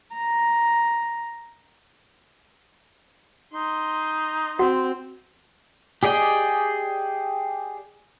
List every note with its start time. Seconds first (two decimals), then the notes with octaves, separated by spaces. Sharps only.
0.14 A#5
3.54 D#4 C6
4.59 C4 F#4 F#5
6.03 G4 G#4 D5 D#5 G5